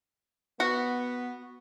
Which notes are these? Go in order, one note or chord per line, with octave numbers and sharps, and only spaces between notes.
B3 F#4